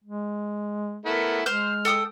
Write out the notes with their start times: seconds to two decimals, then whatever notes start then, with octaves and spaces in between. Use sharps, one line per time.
0.04 G#3
1.06 A3 B3 E4 A#4
1.46 G#3 C5 F6 G6
1.85 A4 G5 D#6